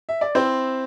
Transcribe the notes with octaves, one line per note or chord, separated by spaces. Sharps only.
E5
D5
C4 E4 C5